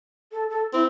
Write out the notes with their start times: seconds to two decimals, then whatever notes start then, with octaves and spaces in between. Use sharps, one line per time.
0.32 A4
0.49 A4
0.73 C4 E4